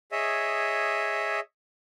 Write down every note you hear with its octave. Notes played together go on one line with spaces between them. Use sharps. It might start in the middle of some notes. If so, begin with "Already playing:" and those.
G#4 C#5 D#5 E5